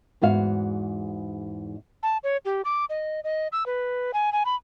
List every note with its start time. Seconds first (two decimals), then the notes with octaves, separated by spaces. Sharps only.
0.22 E2 G#2 F#4 F5
2.03 A5
2.24 C#5
2.45 G4
2.65 D6
2.90 D#5
3.24 D#5
3.52 E6
3.66 B4
4.14 G#5
4.32 G#5
4.45 B5